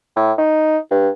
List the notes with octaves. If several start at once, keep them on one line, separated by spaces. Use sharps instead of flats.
A2
D#4
G2